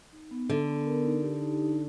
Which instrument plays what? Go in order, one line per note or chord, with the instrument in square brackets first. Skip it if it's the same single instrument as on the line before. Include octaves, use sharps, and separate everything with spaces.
[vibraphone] D#4
B3
[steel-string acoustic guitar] D3 [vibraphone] B3
[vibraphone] B3
A#4
D#4
G4
D#4
D#4